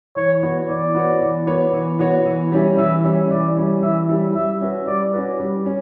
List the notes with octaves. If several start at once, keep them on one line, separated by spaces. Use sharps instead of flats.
E3 C#5
B3 F#4 C#5
E3 D5
B3 F#4 C#5
E3
B3 F#4 C#5
E3
B3 F#4 C#5
E3
G3 C#4 E4
E3 E5
G3 C#4 E4
E3 D5
G3 C#4 E4
E3 E5
G3 C#4 E4
G3 E5
C#4 F#4 B4
G3 D5
C#4 F#4 B4
G3
C#4